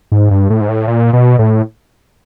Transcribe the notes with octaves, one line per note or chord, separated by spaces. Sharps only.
G#2
G2
A2
G#2
A2
A#2
B2
A2